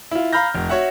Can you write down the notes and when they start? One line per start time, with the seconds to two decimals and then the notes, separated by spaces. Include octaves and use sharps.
0.11 E4 F4
0.33 F5 A#5 B5 F6 G6 A#6
0.55 F1
0.69 F#4 C#5 E5 F#5